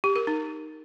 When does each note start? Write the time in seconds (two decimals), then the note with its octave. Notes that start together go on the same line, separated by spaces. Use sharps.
0.04 G4
0.16 A#4
0.27 D#4